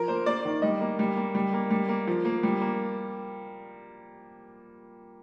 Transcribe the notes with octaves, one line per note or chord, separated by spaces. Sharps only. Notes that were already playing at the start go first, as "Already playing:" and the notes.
Already playing: F3 A#4
A#3 C5
A#3 D5
D#3
G3 D#5
A#3
G3
A#3
G3
A#3
G3
A#3
F3
A#3
G3
A#3